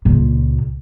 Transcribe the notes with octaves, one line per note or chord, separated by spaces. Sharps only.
C#2 A#2